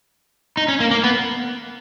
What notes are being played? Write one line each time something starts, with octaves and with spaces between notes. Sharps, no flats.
D#4
C#4
A#3
A#3
B3